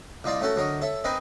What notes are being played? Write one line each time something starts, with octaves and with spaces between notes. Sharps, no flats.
C2 D#4 F4 D5 A#5
A3 C#4 F#4 A4 A#4
D2 F#3 A#4 C#5 D#5
A4 C#5 E5
C4 D#4 A#4 B4 D#5 G#5